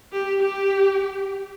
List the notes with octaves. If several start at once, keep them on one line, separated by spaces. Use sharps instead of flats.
G4
G4